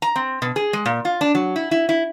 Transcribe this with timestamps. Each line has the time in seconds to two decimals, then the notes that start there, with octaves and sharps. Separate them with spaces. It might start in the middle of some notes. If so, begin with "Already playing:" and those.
0.02 A#5
0.16 C4
0.42 B2
0.56 G#4
0.73 G#3
0.86 A#2
1.05 F4
1.21 D4
1.35 F#3
1.56 E4
1.71 E4
1.89 E4